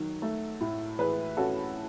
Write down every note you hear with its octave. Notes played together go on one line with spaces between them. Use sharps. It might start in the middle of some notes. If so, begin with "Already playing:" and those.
Already playing: D#3 F#3
A3
A2
E3 G#4 B4
C#4 F#4 A4